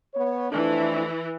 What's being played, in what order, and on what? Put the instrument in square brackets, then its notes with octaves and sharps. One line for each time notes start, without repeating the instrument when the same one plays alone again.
[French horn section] B3 C#5
[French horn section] F2 A3 D4 [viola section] E3